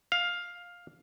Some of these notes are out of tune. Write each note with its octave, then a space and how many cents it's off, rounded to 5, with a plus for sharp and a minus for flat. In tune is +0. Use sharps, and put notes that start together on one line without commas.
F5 +10